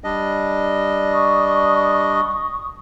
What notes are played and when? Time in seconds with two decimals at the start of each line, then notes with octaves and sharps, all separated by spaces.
0.04 G3 D4 D#5
1.12 C#6 D#6